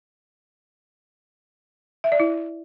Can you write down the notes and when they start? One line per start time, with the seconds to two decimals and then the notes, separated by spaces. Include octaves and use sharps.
2.04 E5
2.12 D5
2.20 E4